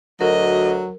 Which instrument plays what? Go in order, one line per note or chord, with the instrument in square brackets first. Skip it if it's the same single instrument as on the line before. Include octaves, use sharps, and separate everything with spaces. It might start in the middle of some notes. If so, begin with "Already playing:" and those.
[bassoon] D2 [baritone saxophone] F#3 [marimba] A#4 [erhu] D#5